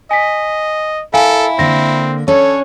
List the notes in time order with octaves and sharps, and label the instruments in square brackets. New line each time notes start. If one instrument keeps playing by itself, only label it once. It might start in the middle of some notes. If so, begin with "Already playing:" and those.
[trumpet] D#5 [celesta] G#5 B6
[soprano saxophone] E4 [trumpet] A4 [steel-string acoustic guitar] A#4 [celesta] F5 G#5
[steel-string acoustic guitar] D3 A#3 [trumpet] C4 [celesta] A#6
[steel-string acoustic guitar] C#4 D4 [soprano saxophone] A4 [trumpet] C#5